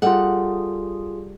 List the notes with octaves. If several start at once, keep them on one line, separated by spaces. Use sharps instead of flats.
G3 F4 G#4 A4 F#5